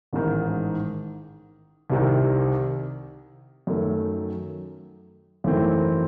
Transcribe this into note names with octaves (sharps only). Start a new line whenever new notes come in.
A1 G#2 D#3
C2 C3 D#3
F#2 D#3 A3
G#1 F#2 E3 A3 C4